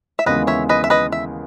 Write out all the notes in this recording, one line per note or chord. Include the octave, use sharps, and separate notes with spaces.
E5
D#2 C#3 E3 G#3 B3 B4 D#5
C#5 E5
B4 D#5
E5
B4 D#5
E5